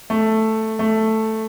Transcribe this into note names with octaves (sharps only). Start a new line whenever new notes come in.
A3
A3